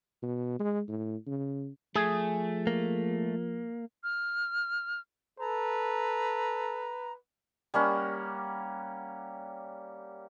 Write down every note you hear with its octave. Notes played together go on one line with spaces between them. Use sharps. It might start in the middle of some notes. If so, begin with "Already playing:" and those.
B2
G#3
A2
C#3
F3 A3 G#4
A#3
F6
A4 B4 A#5
G3 A#3 C#4 F#5